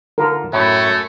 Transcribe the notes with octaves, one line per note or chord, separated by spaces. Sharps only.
D3 F4 A4 A#4
F#2 A2 A3 C#5